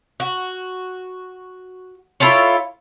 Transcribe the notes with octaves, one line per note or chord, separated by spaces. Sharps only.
F#4
E4 F4 A4 C#5